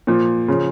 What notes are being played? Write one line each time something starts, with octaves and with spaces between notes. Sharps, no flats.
A#2 F3
C#3 F3